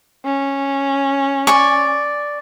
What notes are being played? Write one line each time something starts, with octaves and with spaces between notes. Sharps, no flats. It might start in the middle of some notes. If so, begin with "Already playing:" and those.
C#4
D5 G#5 C#6